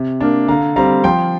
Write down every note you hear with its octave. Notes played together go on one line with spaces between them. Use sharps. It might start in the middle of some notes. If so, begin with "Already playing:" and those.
Already playing: C3
A#3 D4
D3 F5 A#5
G3 C4 F5 A#5
F3 G5 C6